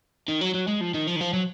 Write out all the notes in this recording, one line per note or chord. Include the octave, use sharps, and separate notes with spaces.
D#3
F#3
F#3
G#3
F3
D#3
F3
D#3
F3
F#3